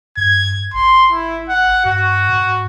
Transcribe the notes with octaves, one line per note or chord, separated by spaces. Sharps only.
G2 G#6
G#1 C6
E4
F#5
G2 F#4
G#2